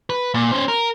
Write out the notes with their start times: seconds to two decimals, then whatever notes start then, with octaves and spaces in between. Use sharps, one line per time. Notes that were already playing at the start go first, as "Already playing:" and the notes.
0.10 B4
0.34 A#2
0.52 C#4 C5
0.68 A#4